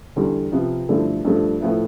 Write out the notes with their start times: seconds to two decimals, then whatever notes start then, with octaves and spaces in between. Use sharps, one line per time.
0.16 E2 D3 G3
0.52 C3 F3 B3
0.89 G2 D3 F3 A3 E4
1.25 G2 F3 A3
1.61 A2 F3 B3 E4